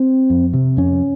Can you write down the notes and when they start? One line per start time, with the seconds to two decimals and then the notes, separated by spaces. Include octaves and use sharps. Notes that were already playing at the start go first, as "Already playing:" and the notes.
Already playing: C4
0.30 F2
0.53 C3
0.77 F2 C#4